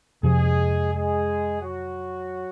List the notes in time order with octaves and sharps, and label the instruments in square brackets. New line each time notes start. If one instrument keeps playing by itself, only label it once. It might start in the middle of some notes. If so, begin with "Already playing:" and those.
[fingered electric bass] F2 C3 F3 [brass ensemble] G#3 G#4
[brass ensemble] G#3 G#4
F#3 F#4